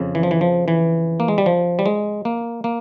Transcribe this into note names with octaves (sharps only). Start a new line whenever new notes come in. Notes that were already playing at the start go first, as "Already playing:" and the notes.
Already playing: F2 C#3
E3
F3
E3
F3
E3
A#3
G#3
G3
F3
G3
G#3
A#3
A#3